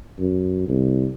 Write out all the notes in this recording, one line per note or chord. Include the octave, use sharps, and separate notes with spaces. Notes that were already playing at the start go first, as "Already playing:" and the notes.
F#2
C2